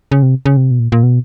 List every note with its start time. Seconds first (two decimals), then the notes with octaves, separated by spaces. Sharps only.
0.12 C#3
0.23 C3
0.46 C#3
0.57 C3
0.71 B2
0.79 A#2
0.92 A#2
1.03 B2